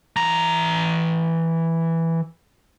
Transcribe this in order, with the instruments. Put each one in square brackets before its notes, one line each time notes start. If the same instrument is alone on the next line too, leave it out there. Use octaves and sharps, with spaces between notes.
[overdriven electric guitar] E3 A#5